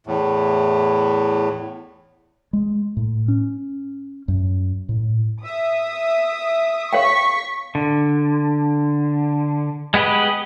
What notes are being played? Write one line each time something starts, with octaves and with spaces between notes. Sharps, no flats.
E2 A2
G#3
A2
C#4
F#2
A2
E5 D#6
C#5 F5 G5 C#6 B6
D3
G#3 B3 G4 B4 D#5